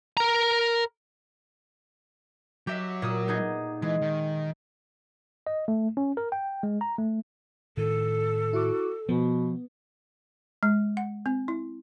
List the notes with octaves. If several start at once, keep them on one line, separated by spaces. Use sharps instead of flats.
A#4 A#5
F#3 G4 E5
A#2 D#6 E6
B3 D#4 G#4
E3 G#3
D#3
D#5
A3
C#4
A#4
G5
G#3
A#5
A3
A2 D#3 A4
E4 F#4 D6
B2 F3 B3
G#3
F#5
C4
E4